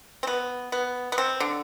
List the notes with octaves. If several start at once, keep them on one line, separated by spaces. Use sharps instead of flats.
C4
B3
B3
B3
C4
D3